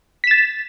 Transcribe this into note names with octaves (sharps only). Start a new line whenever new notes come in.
A6 B6 E7